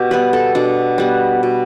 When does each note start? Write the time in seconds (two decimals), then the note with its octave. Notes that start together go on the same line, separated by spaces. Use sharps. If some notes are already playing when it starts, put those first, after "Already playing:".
Already playing: B2 G4
0.11 G3 B3 B4
0.33 A4
0.55 B2 D4
0.98 G3 B3
1.43 B2